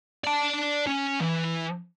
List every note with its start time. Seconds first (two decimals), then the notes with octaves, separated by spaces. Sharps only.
0.24 D5 A5
0.87 C#4
1.21 E3